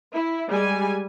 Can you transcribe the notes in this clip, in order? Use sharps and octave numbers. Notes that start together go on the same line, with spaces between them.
E4
G3 G#3 G#5